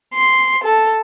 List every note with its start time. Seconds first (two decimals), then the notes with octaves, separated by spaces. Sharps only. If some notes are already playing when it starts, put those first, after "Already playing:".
0.13 C6
0.64 A4